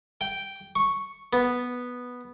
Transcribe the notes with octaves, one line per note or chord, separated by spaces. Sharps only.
G5
C#6
B3